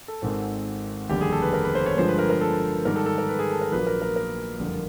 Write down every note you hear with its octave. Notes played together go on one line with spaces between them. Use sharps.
A4
G#1 G#2 D#3 G#3 C4
F1 D#2 D3 G3 G4
G#4
A4
B4
A#4
B4
C5
C#5
G2 D3 F3 G#3 C5
B4
A#4
A#4
A4
G#2 D#3 G3 A#4
A4
A4
A#4
B4
G#4
A4
A#4
A#1 A#2 F#3 A#3 B4
A#4
A#4
A#4
F#1 F2 D3 G3